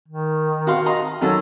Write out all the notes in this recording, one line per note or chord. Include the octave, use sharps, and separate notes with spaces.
D#3
F#4 F5 C6
D#5 A#5 C6
D#3 F#3 C#4 A4